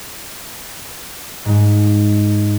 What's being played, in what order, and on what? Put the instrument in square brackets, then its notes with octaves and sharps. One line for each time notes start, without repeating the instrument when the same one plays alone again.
[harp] G#2